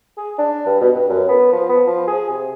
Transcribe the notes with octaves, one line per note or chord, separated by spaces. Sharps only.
G#4
D4
G2
B2
G2
F#2
B3
F3
B3
F3
G#4
C3